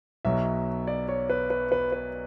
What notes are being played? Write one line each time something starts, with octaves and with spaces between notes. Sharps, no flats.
B1 B2 F#3 E5
D5
C#5
B4
B4
B4
B4